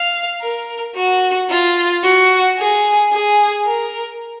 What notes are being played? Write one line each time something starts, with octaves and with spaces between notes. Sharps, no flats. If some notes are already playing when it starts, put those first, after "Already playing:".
Already playing: F5
A#4
F#4
F4
F#4
G#4
G#4
A#4